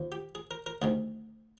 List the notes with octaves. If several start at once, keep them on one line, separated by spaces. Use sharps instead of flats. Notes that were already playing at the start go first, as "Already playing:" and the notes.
Already playing: D#2 F3
G4
G#4
A#4
A#4
D2 C3 D#3 G#4